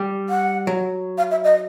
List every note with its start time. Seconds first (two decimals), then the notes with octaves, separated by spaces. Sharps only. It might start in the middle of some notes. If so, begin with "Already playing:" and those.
Already playing: G3
0.29 F#5
0.67 F#3
1.18 F5
1.31 E5
1.44 D#5